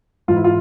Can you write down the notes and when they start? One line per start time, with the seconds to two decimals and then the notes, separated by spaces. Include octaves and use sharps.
0.28 G#2 E3 F4
0.36 E4
0.44 F4